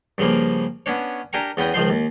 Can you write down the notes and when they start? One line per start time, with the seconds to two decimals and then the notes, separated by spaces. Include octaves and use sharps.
0.18 G2 C#3 F3 A#3
0.86 B3 C#4 D4 C#5
1.33 D4 G4 A#4 G#5 A#5 C#6
1.57 E2 B3 C#4 G5 D#6
1.74 C#2 D#3 F3 C5
1.90 D#2